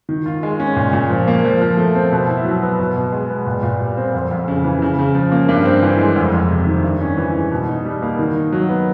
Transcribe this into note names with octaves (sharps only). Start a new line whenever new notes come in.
D#3
F4
G#3
C#4
A#2
A#2
F3
A#3
F3
F3
A3
C4
B2
E4
F#3
B3
B2
B2
G#3
B3
A#2
A#2
G3
C4
F2
F2
C#3
E3
C#3
C#3
F3
A#3
G2
C4
E3
G#3
F2
F2
C3
D#3
G2
C#4
E3
G#3
B2
D#4
G3
A#3
D#3
D#4
F#3
B3